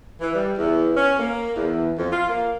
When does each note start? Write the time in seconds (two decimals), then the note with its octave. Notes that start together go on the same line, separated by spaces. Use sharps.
0.21 E3
0.35 G3
0.58 E2
0.97 C#4
1.19 A#3
1.56 E2
1.98 F2
2.12 F4
2.29 A#3